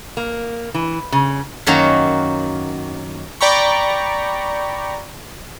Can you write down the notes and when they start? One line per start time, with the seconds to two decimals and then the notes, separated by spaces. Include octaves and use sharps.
0.17 A#3
0.74 E3
1.12 C#3
1.67 F#2 D#3 A#3 F#4 C#5 A#5
3.41 D5 G5 A#5 B5 C#6